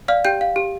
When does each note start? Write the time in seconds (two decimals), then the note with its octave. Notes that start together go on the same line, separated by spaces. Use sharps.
0.08 D5 F5 F6
0.25 G4 G5 G6
0.41 F5
0.56 G4